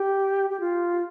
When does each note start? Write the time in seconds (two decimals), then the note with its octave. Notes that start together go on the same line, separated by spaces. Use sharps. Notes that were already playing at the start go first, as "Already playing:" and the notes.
Already playing: G4
0.50 G4
0.60 F4